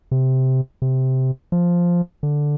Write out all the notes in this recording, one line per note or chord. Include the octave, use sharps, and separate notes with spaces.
C3
C3
F3
D3